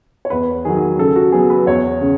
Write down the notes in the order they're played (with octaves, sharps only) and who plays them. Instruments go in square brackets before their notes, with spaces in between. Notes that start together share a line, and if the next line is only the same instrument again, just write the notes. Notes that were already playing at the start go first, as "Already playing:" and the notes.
[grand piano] C#5
E2 B4
D#3 F#3 G#4
C#3 A4
F#4
F#3 B3 G#4
B4
E2 C#5
C#3